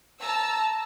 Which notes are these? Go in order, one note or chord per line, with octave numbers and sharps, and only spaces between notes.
A5 A#5 E6